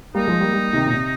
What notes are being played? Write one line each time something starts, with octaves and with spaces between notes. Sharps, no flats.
G3 A#3 D#4
F3 G#3
G3 A#3
G3 A#3
C3 D#3
A#2
C3